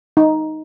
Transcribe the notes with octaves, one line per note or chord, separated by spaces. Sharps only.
D#4